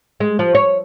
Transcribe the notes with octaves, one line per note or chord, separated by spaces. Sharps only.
G#3
F3
C#5